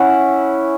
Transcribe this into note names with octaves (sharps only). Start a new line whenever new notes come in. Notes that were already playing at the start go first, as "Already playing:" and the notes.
Already playing: C#4 E4 F#5